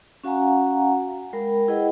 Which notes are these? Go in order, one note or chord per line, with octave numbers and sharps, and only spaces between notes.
C#4 F#4 F5 F#5 G#5 A#5
G#3 A#4 G5 B5
E4 G#4 B4 D#5 F#5 G5